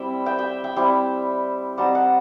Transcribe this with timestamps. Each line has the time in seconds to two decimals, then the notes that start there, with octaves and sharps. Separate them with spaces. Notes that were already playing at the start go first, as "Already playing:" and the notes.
Already playing: G3 C4 E4 E5 G5
0.26 E5 G5
0.39 E5 G5
0.64 E5 G5
0.76 G3 C4 E4
1.77 G3 C4 D#4 F#5 A5
1.95 F#5 A5